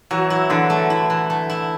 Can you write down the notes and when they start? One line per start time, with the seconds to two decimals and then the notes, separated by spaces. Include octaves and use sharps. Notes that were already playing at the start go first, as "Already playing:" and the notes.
0.11 E3 F#3
0.30 E4
0.50 D3 E3
0.70 A3
0.90 E4
1.10 E3
1.30 A3
1.50 E4